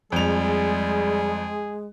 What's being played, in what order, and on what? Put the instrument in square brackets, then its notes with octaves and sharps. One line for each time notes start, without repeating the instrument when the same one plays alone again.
[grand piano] F2 F7 [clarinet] G3 [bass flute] G#3 [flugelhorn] G#4